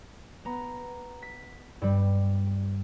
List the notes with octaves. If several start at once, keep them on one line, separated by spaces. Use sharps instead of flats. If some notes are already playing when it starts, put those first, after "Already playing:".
B3 A#5
B6
G2 G3